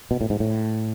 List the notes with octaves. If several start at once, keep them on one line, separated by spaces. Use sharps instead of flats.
B2
A2
G#2
A2